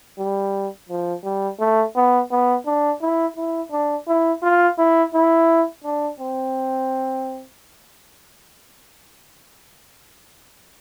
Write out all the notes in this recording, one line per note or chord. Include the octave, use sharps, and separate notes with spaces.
G3
F3
G3
A3
B3
B3
D4
E4
E4
D4
E4
F4
E4
E4
D4
C4